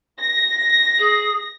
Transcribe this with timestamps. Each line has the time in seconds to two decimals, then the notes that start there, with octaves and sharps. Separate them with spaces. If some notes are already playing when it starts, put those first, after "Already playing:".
0.19 A#6
0.99 G#4